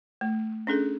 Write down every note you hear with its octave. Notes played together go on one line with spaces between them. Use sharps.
A3
C#4 D4 G#4 A4